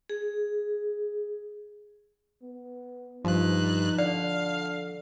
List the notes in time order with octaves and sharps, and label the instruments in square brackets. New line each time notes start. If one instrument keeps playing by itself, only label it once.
[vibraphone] G#4
[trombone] B3
[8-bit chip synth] G2 F#6 [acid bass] F3 [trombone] D#4
[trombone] D3 [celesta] D5 [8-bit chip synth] F5